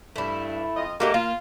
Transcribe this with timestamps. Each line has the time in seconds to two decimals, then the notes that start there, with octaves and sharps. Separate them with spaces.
0.16 G2 A3 E4
0.77 F2 F4 D#5
1.00 G#2 A3 A#3 F#4 G4 D#5
1.14 A#3 F4